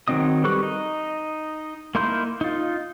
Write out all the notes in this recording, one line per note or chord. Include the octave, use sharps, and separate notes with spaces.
D#3 F#3 C4 D#5 D#6
G3 A4 B4 C#6 F#6
D#4 D#5
A#3 D#4 E4 C6 G6
D#4 F4